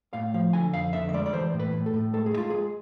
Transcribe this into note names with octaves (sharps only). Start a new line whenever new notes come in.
A2 F5
F3 F5
D3 G#5
F2 F5
D3 E5
E5
G#3 D5
D5
E3 C5
A2
B4
A2
A4
A2
G#3 A4
G#4
G#3 F4
G#3 G#4